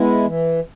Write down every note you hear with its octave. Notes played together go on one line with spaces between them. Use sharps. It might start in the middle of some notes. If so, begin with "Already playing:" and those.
Already playing: G#3 B3 E4
E3